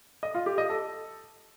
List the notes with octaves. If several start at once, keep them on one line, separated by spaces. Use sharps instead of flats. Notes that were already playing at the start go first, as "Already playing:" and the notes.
D#5
F4
G4
D#5
A4